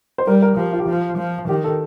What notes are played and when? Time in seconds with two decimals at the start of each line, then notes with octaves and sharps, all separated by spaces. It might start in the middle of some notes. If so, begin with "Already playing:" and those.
0.18 C5
0.27 G3 A#4
0.42 A#4
0.57 F3 G4
0.73 F4
0.80 G4
0.87 F3 F4
1.18 F3
1.49 D#3 G4
1.64 A4